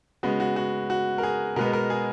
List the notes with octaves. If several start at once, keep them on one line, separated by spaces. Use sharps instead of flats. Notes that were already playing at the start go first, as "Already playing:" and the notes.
C#3 G#3 B3 F#4
F#4
F#4
F#4
A#4
G#4
B2 G#3 B3 A#4
A#4
G#4